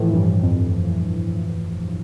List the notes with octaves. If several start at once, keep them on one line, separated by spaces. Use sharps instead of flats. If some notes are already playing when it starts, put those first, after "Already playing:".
Already playing: A2 E3 F3
G2
F2